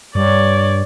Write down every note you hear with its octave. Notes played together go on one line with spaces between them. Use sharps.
G2 C#5 D5